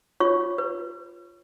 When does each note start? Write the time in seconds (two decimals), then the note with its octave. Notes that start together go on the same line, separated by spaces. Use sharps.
0.20 F4 C#5 C#6
0.58 B4